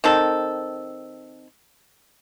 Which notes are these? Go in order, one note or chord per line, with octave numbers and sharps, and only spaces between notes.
D#3 C4 A4